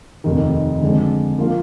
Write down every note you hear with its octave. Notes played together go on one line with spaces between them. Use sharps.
F1 D#2 D#3
F2 D3 G#3
F3 A#3 F4